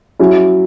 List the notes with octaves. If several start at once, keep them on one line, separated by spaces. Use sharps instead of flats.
F#3 C#4 E4